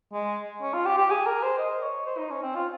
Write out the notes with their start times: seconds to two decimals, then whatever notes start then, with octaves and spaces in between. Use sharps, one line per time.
0.13 G#3
0.62 C#4
0.74 F4
0.86 G4
0.97 G4
1.10 G#4
1.27 A#4
1.43 C5
1.58 D#5
1.83 C#5
2.06 C5
2.18 D#4
2.31 C#4
2.42 C4
2.55 F4